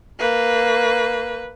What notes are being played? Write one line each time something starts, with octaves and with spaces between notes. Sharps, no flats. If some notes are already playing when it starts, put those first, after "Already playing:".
A#3 B4